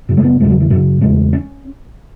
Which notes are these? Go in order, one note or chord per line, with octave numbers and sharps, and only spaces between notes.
F#2 C#3
G#3
B3
E2 C#3 G#3
F#3
E3
F#2 C#3 F#3
E2 C#3 G#3
C#4